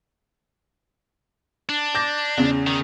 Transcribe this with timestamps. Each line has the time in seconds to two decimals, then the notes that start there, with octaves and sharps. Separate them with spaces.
1.69 D4
1.95 D6 G6 A#6
2.38 E2 C#3
2.66 D#3